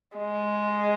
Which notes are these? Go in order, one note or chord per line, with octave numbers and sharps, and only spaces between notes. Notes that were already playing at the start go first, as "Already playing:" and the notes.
G#3